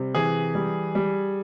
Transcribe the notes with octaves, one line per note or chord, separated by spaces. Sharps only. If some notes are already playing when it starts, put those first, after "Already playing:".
Already playing: C3 G3
E3 G#4
G3
G3